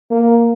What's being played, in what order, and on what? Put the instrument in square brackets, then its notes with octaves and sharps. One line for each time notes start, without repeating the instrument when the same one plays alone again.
[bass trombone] A#3